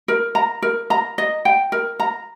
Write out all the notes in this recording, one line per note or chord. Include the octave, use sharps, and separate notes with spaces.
A#4
A#5
A#4
A#5
D#5
G5
A#4
A#5